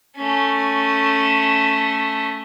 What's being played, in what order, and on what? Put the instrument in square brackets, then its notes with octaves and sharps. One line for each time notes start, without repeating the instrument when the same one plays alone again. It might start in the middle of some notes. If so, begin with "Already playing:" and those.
[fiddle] A3 C#4